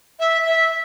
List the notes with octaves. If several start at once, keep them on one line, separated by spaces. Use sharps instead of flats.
E5
E5